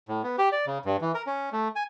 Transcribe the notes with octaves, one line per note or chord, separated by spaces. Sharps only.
A2
B3
G4
D5
C#3
G2
E3
A#4
C#4
A3
G#5